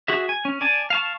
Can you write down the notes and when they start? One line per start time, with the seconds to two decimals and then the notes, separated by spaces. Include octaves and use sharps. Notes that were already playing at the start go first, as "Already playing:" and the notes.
0.08 F#4 G#4 E5
0.29 G#5
0.45 C#4
0.61 D5 G#5 A5
0.90 F5 A5 C#6